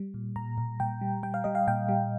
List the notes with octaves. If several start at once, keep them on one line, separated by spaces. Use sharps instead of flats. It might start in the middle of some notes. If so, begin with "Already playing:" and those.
Already playing: G3
A#2
A#2 A#5
A#2
A#2 G5
G3
G3 G5
F5
G3 D#5
F5
A#2 G5
G3